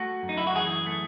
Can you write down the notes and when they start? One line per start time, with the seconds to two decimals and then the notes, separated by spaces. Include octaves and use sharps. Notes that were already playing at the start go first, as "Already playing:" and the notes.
Already playing: A3 F#4
0.23 F#2
0.29 D#4
0.38 E4
0.47 F#4
0.55 E3 G#4
0.86 A3